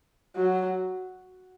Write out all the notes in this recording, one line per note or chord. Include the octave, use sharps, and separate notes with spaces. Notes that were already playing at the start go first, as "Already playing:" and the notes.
F#3